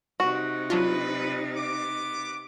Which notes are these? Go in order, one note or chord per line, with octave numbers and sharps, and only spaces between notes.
C3 D#4 F#4
F#3 D4 F4 B4
B3 D6